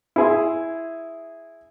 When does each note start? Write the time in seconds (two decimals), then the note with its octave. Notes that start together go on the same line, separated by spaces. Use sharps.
0.16 E4 G#4 C6